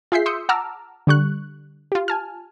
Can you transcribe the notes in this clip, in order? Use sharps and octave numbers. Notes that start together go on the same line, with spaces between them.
F4 G#4 E5 G6 B6 C7
C6 D#6 E6 G6 C#7
F#5 A5 A#5 D6 E6 F6
D3 G3 C#6 F#6
F4 G4
G#5 A5 F6